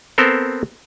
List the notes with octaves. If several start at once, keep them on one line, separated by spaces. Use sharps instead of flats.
B3 C4 A4 A#4 C5